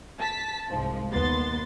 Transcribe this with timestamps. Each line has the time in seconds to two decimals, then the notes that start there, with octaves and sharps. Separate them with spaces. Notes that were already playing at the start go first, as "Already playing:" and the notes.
0.20 A5 B6
0.70 C2 G#2 F3
1.11 D#2 B3 C6 A6